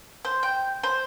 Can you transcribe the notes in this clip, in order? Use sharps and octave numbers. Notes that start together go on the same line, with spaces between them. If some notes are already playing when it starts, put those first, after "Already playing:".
C5
G5
C5